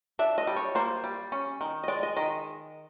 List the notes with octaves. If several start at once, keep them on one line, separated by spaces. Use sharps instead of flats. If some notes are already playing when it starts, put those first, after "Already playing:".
D4 E5
D#5
G3
C#5
A#3 C5
G3
C#4
D#3
D#5
G#3 D5
D#5
D#3 D#5